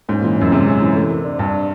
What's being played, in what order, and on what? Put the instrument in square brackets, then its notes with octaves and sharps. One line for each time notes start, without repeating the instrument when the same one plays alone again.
[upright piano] G#2 [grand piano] C#4
[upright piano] A#2 [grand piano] E3
[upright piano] F#2 [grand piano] C#4
[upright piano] C3 [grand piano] G#3
[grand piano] C#4
E3
A3
A#4
D4
[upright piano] G2 [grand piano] D4
[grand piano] D4